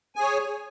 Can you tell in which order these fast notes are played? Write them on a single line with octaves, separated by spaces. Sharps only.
G#5 G#4 C#5